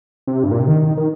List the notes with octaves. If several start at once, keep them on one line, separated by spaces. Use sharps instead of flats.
C3
G2
A#2
C3
D#3
D#3